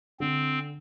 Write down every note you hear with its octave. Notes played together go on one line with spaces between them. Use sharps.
D3 C4